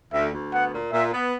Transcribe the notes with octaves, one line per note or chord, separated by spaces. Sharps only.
D2 E5
D2
B3 F#5
A#2
A#2 E5
B3